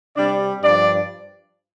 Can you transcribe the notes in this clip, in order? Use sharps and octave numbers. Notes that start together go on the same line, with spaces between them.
C3 G3 D4 D5
G2 F3 D4 D5